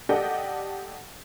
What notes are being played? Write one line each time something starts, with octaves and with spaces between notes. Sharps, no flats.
G4 A4 D5 D#5 F#5 G5